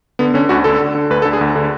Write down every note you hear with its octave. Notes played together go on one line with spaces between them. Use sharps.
D3 B3
D3 C#4
D2 F#4
D3 A4
D3
D3
D2 B4
A4
D3
G#4
D2
D3